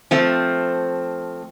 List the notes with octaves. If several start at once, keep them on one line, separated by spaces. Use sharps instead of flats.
F3 A3 C4